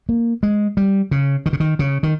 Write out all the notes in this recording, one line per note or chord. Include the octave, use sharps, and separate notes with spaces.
A#3
G#3
G3
C#3
D#3
C#3
D#3
C#3
D#3